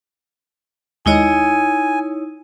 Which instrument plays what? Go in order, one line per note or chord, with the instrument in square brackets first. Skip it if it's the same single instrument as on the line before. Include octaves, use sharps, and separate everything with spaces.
[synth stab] D#2 G#3 D#5 [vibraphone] D#4 E4 C#5 [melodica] G#5